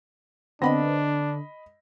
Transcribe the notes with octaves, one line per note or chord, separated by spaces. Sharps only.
D3 B3 C4 D4 D#5 B5 A#6